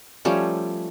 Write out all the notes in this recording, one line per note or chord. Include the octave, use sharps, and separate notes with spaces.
F3 G3 A3 C#4